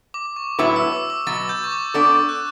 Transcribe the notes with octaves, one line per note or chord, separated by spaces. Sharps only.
D6
C#6
A2 F#3 B3 E4 B4 D6
E6
D6
D6
B2 F#3 B3 A6
G6
C#6
D6
B3 D4 A4 D5 E6
F#6